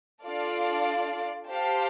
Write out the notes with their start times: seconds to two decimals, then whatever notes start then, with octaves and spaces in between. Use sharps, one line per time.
0.25 D4 F4 A4 D5 F5
1.50 G4 C5 F5 A5